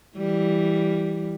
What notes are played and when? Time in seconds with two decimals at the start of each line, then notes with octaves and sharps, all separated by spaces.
0.17 E3 G3